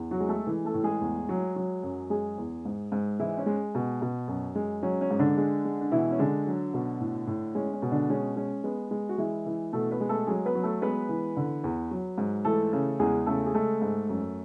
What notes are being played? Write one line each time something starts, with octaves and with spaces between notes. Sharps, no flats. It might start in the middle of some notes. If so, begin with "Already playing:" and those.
Already playing: E2
F#3 F#4
G#3
A3 A4
E3
A3 A4
A2
G#3 G#4
E2
F#3
F#3
F#2
G#3 G#4
E2
G#2
G#2
E3 G#3 E4
C#4
G#3
B2
B2
F#2
G#3
F#3 C#4
C#4
G#2
D3 D4
G#3
G#3
D4
B2 E3 E4
C#4
D3 G#3 D4
F#3
B2
A2
A2
G#3 C#4
C#4
B2
D3 D4
G#3 C#4
G#3 C#4
G#3 B3
G#3
F#4
E3 G#3 E4
E3
B2 A3 A4
B3 B4
G#3
A3 A4
F#3 G#3 G#4
B3 B4
F#3
A3 A4
G#3 B3 B4
E3
D3
E2
F#3
G#2
E3 A3 A4
C#3
E2 G#3 G#4
C#3 A3 A4
G#4
G#3 A3 A4
G#2
F#2